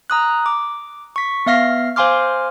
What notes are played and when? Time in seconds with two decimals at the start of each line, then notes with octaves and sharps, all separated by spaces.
0.10 A#5 D#6 F#6
0.46 D6
1.16 C#6 B6
1.46 B3 E5 F5 F6 A#6 C7
1.96 C5 F5 G#5 C6 D6 F6